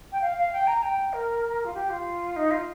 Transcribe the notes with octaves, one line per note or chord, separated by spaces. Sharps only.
G5
F5
F5
G5
A#5
G5
A#4
F4
G4
F4
D#4
F4